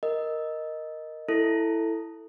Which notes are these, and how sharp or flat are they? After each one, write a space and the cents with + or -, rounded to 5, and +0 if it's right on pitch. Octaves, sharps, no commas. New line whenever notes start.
A#4 +0 D#5 +0
E4 +0 A4 +10